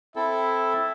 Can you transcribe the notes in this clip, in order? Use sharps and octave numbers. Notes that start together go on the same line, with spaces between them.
C4 E4 A4 E5